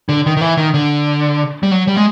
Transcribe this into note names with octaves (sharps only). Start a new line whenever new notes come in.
D3
D#3
D#3
E3
D#3
D3
G3
F#3
G3
G#3